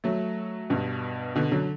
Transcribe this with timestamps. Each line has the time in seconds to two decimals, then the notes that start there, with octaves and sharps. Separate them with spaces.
0.04 F#3 A3
0.70 G2 B2
1.36 B2 D3
1.52 D3 F#3